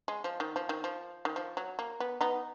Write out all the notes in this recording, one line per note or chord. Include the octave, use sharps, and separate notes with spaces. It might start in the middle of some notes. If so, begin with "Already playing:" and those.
G#3
F3
D#3
F3
D#3
F3
D#3
F3
F#3
A#3
B3
B3 D#4